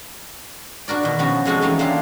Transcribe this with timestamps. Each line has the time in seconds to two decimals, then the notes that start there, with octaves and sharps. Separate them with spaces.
0.88 D4 F#4 A#4 D5
1.03 B2 D#3
1.19 F3 B3 C#4 F#4
1.45 C3 F3 G#3 F#4 A4 C#5
1.62 E3 F#3 A3 C4 C#4 D#4
1.79 A#3 D4 F4 G4 G#4 E5